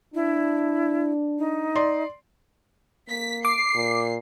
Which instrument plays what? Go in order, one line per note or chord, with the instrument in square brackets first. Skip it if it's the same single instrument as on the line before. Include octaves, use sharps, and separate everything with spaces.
[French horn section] D4 [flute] E4
[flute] D#4
[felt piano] D5 C6
[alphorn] A#3 [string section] B6
[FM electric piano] D6 [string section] C7
[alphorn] A#2